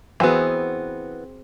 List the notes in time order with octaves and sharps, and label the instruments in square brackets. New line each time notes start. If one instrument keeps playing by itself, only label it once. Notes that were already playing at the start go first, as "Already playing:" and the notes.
[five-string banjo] E3 B3 [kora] C4 F#4 G#4